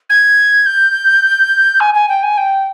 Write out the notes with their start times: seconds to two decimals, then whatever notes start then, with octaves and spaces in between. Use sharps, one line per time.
0.09 G#6
0.66 G6
1.80 G#5
1.94 G#5
2.08 G5
2.22 G#5
2.37 G5